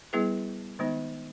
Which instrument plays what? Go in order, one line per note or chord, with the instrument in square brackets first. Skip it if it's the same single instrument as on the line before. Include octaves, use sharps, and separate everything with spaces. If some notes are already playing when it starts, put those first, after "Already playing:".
[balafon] G3 B3 E4 G#4 B4
D#3 G#3 B3 D#4